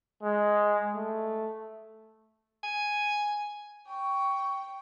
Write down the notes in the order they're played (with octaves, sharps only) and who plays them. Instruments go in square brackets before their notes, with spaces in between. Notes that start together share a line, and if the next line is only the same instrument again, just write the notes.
[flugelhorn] G#3
A3
[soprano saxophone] G#5
[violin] G5 [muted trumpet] C#6